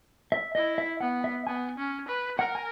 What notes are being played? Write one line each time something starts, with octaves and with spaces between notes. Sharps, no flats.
E5
E4 D#5
E5
B3 F#5
E5
B3 G#5
C#4
B4
A#4 F#5
G#5